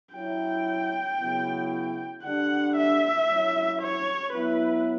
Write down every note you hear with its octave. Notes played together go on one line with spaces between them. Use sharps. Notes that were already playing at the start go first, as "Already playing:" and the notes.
F#3 C#4 E4 G5
C#3 F#3 B3 E4
D3 G3 D4 F#5
E5
F#3 C#4 E4
C#5
F#3 B3 E4 B4